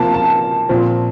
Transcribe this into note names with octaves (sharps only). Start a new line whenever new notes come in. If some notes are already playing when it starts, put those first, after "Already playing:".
Already playing: C3 F3 A#3 A5
A5
A#2 F3 C4